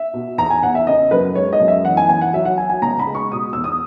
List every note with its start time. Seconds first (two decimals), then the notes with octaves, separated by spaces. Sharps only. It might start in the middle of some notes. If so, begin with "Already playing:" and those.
Already playing: E5
0.14 B2
0.38 E2 A#5
0.50 G#5
0.63 E2 F#5
0.75 E5
0.87 C#3 D#5
1.11 F#2 B4
1.35 G#3 C#5
1.53 D#5
1.60 F#2
1.68 E5
1.84 E3 F#5
1.97 G#5
2.09 E3 G#5
2.21 F#5
2.33 F#3 E5
2.45 F#5
2.58 F#3 G#5
2.70 G#5
2.82 C#2 A#5
2.99 B5
3.07 G#3
3.15 C#6
3.32 B2 D#6
3.53 E2 E6
3.64 D#6